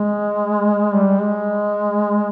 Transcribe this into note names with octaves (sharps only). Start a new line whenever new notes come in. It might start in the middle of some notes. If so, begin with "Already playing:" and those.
Already playing: G#3
G3
G#3